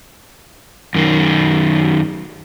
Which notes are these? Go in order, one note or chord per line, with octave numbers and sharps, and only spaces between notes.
F#2 D#3